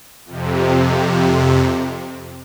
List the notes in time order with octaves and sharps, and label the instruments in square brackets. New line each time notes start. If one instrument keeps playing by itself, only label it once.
[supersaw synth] F2 C3